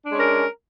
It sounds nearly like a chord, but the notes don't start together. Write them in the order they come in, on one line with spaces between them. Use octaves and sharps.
D4 G#3 C#4 A#4